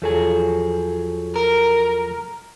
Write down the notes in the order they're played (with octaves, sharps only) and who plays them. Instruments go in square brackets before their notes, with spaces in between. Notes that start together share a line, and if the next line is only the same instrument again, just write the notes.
[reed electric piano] E2 A4 [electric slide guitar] F3 F#3 G#4
[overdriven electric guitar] A#4